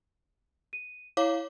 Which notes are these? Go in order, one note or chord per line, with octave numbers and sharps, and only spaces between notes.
D#7
E4 C#5 F5 D6